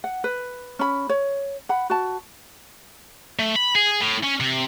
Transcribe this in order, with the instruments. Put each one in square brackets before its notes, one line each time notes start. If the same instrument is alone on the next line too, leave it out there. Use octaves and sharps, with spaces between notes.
[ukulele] F#5
B4
C#4 B5
C#5
F#5 B5
F#4 A5
[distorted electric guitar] A3
B5
G#4
A2
C#4
C3